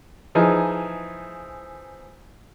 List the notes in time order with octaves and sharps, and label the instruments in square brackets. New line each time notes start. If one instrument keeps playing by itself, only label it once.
[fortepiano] E3 F3 D#4 G#4